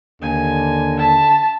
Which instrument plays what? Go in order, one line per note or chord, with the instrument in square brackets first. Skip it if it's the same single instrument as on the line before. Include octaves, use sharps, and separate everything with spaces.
[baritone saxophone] D#2 [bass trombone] D3 [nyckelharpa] G#5
[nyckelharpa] E5 [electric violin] A5